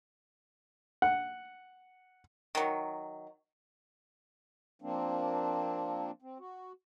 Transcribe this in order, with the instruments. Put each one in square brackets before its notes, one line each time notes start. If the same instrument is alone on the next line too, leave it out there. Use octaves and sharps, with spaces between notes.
[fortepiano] F#5
[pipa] D#3 F#3
[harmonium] F3 A#3 C4 D4
C4
F#4